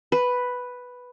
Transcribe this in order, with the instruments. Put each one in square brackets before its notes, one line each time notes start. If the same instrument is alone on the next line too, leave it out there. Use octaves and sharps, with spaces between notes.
[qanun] B4